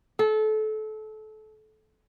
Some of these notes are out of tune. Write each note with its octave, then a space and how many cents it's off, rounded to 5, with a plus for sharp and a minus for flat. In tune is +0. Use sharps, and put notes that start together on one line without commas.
A4 -25